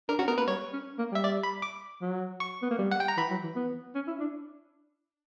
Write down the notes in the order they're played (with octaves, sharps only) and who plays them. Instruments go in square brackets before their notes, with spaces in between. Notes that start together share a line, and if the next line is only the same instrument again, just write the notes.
[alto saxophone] D4 [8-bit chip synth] A#4
[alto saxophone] C#4 [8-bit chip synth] F#4
[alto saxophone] B3 [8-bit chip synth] A#4
[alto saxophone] A#3 [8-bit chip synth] B4
[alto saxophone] G3 [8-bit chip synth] C#5
[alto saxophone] C#4
A#3
[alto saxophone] G3 [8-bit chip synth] E5
[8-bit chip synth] D5
B5
D6
[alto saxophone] F#3
[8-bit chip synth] C#6
[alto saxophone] B3
A#3
G3
[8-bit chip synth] F#5
G5
A#5
[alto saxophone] E3 [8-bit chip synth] B5
[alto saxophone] F#3
E3
B3
C#4
E4
D4